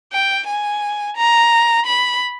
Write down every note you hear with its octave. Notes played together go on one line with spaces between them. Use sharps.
G5
G#5
A#5
B5